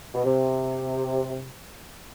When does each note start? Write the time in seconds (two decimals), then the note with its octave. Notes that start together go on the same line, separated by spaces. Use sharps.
0.14 B2
0.25 C3